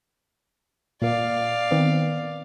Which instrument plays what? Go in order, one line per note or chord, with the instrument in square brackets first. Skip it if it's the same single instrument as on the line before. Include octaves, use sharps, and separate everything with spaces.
[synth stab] A#2 A#3 [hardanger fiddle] D5 F5
[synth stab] D#3 B3 C4